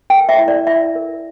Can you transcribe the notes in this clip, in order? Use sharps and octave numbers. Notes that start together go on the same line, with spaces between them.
A#4 G5
E5
E4
D5
E4 E5
A#4